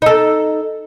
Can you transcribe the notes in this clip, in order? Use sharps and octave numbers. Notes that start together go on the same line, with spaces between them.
D#4 A4